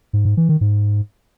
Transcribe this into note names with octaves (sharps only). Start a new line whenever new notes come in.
G#2
G#2
E3
D#3
G#2